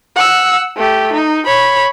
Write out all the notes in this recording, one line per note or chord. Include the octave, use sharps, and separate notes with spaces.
F#5 E6
A3 G4
D#4
C#5 B5